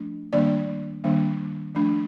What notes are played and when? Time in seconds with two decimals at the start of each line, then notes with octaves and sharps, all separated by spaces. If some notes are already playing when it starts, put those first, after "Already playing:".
Already playing: F3 A3 D4
0.33 D#3 G3 A#3 D4 D5
1.04 D#3 G3 A#3 D4
1.75 F3 A3 D4